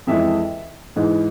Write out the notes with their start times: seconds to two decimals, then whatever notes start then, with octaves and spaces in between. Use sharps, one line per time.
0.07 F2 E3 G#3 E5
0.96 G#2 E3 G#3